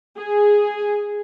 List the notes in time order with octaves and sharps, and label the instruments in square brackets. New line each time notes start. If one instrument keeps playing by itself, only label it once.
[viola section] G#4